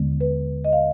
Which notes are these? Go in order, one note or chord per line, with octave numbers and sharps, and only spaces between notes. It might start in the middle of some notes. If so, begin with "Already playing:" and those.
Already playing: D#2 D3 G#3 B3
B4
D#5
F5